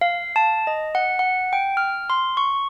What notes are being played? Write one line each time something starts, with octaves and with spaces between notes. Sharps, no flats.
F5
A5
D#5
F#5
F#5
G5
F6
C6
C#6